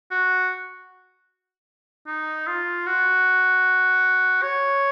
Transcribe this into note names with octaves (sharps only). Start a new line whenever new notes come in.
F#4
D#4
F4
F#4
C#5